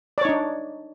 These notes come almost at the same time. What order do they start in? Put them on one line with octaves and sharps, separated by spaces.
D5 C#5 D#4 D4